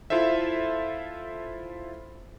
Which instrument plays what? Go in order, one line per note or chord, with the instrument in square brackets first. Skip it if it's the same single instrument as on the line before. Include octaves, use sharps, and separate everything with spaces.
[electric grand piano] E4 F4 A4 C5 E5